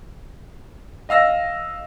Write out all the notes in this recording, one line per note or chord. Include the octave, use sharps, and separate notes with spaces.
D#5 F5 E6 A#6